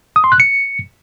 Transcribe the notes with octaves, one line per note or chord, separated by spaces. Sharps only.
D#6
C6
F#6
C#7